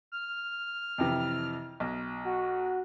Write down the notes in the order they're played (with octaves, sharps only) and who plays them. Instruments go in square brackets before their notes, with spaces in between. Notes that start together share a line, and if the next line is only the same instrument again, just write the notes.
[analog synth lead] F6
[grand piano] F2 C3 E3
B1
[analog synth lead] F#4